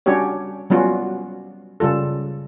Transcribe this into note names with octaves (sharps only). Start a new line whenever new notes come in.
G3 C#4 D4 F#4 G4 C#5
F#3 G3 B3 C#4 F4 F#4
C#3 G3 F4 A4